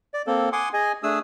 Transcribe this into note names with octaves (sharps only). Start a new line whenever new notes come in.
D5
A#3 C4 A4
F#5 G#5 C6 D6 D#6
G#4 D#5 G#5
A3 D4 G#4 D#6 E6